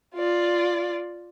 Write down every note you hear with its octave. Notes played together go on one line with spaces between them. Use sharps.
F4 D5